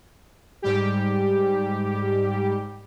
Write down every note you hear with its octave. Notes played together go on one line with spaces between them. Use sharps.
G#2 G3 G4